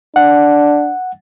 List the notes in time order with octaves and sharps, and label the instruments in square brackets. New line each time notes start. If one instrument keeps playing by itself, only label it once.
[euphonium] D4 [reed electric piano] F#5